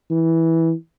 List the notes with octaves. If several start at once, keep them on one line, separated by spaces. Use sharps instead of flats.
E3